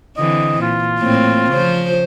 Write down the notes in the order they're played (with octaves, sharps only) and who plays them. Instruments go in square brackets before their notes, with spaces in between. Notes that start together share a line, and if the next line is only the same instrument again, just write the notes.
[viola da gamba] D3 E3 C4 [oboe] D#5
[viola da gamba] A#2 [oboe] F4
[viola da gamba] A2 A#3 C4
C#3 F3 C5